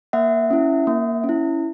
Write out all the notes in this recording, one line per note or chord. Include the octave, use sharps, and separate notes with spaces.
A#3 E5 F#5
C#4 E4
A#3
C#4
E4